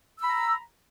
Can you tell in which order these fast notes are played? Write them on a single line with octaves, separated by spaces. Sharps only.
E6 B5 A#5